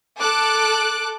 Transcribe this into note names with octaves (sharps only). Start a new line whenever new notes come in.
A4 D6 F#6